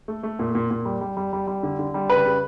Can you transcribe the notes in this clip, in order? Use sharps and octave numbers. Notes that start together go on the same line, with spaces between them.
A3
A3
A#2
A#2
A#2
G3
G3
G3
G3
G3
D3
D3
G3
C#3 B4
C#3